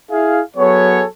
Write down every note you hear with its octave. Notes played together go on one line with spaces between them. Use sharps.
E4 G#4 E5 F5
F#3 B3 G#4 A4 C#5